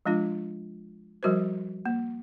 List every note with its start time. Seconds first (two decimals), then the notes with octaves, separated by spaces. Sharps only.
0.06 F3 G#3 D4 F4
1.23 F3 G3 F#4 A#4 C5
1.86 A#3